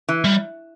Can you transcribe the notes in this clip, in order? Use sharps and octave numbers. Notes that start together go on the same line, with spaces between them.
E3
G3